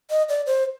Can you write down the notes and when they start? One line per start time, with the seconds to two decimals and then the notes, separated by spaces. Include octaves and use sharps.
0.10 D#5
0.29 D5
0.46 C5